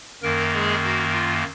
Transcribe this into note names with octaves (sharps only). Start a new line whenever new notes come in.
F#2 D#3 A#3 A#4
G#3 G#4
F#4
F4